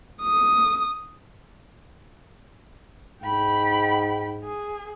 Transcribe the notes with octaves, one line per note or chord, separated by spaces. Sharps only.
D#6
G#2 G5 B5
G#4